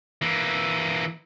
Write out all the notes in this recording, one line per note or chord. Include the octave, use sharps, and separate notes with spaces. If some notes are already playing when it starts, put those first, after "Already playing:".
E3 A#3